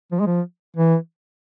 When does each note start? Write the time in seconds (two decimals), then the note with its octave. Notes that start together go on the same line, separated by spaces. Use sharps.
0.12 F3
0.20 G#3
0.27 F3
0.77 E3